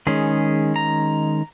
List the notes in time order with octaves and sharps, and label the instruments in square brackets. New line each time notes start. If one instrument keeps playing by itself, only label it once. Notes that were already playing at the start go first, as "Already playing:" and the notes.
[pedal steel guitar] D#3 G#3 C#4 G#4
A#5